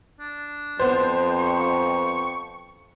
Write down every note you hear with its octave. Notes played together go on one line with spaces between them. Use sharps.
D4
F2 B3 C5
C#6